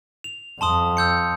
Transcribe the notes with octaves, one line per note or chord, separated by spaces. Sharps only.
F7
F2 A5 C6 D#6
E6 G6 C#7